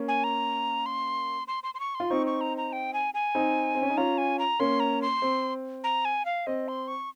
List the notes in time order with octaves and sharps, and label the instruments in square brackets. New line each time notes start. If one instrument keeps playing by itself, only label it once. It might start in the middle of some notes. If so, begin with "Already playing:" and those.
Already playing: [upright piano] A#3 C#4
[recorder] G#5
A#5
C6
C6
C6
C6
C#6
C6
[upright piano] F4
[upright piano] C4 D#4 [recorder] C#6
[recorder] C#6
A#5
A#5
G5
G#5
G#5
[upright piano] C4 D#4
C4
C#4
D#4
[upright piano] C#4 F4 [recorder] A#5
[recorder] G#5
A#5
[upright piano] A#3 C#4 [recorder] C6
[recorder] A#5
C6
[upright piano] C4
[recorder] A#5
G#5
F5
[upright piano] C4 [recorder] D#5
[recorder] C6
C#6